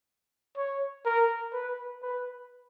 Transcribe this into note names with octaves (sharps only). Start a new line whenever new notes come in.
C#5
A#4
B4
B4